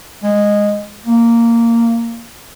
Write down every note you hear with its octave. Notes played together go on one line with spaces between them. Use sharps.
G#3
A#3